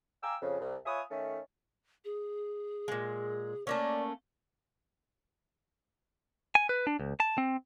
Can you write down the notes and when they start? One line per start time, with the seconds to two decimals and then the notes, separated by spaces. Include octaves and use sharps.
0.23 F5 G5 G#5 A#5 D6 E6
0.41 F2 C#3
0.60 C2
0.85 F4 B4 C#5 E5 G#5 D#6
1.10 D#3 A3 C#4
2.05 G#4
2.88 A#2 G#3
3.67 A3 A#3 C#4 D5
6.55 G#5
6.69 B4
6.87 D4
7.00 C#2
7.20 A5
7.38 C4